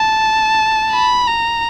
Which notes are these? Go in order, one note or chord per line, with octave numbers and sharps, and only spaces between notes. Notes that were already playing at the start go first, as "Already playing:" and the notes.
Already playing: A5
B5
A#5